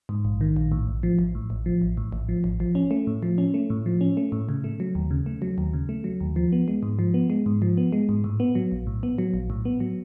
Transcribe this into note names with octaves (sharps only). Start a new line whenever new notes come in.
G#2
A#1
D#3
A#1
A2
A1
F3
A1
A2
A1
F3
A1
A2
A1
F3
A1
F3
C#4
A3
A2
F3
C#4
A3
A2
F3
C#4
A3
A2
C#3
A3
F#3
D#2
C#3
A3
F#3
D#2
C#3
A3
F#3
D#2
F3
B3
G#3
G#2
F3
B3
G#3
G#2
F3
B3
G#3
G#2
A2
B3
F#3
A#1
A2
B3
F#3
A#1
A2
B3
F#3